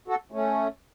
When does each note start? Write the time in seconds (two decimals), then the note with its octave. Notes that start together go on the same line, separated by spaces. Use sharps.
0.08 F#4 A4
0.32 A3 C#4